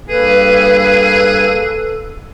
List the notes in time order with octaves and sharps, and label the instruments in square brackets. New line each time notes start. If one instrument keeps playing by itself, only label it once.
[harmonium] G2 A#3 [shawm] G#4 [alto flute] A4 [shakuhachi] B4